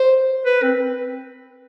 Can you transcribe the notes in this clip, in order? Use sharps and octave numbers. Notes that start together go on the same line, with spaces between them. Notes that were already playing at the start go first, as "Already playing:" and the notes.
Already playing: C5
B4
C4